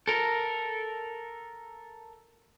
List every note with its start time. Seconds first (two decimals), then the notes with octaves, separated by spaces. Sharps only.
0.08 A4 A#4